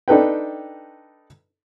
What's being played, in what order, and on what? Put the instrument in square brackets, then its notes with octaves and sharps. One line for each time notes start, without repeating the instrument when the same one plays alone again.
[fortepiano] D4 D#4 A4 B4 G5